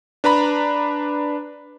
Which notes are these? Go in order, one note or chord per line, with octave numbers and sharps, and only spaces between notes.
D4 B4 A#5 B5